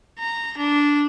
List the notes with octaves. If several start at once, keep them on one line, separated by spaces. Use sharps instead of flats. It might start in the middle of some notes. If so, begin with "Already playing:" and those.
A#5
D4